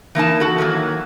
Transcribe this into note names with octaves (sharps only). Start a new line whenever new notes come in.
E3 A#3 D#4 A5
F#4 A4
D#3 E3 F#3 A#3